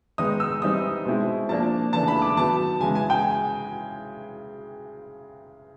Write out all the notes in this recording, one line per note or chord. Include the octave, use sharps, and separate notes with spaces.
D#3 G#3 B3 D#4 D#6
E6
E3 G3 C4 D#4 D#6
B2 G#3 C4 E4
F3 A#3 D4 A5
C#3 E3 A3 D4 A5
B5
D6
D#3 F#3 B3 A5
C#3 E3 G#3 G#5
G#5
G5